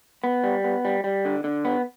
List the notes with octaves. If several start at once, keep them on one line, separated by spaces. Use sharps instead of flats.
B3
G3
B3
G3
G3
D3
D3
B3